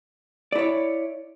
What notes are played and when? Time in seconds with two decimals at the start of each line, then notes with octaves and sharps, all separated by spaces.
0.52 D5
0.55 E4
0.58 C#5